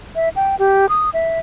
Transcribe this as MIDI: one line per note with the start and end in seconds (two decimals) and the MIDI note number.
0.15 0.29 76
0.36 0.56 79
0.59 0.89 67
0.89 1.10 87
1.14 1.40 76